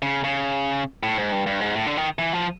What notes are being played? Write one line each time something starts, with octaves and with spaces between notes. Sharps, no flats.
C#3
C#3
A2
G#2
G2
G2
G#2
A2
D3
D#3
E3
F3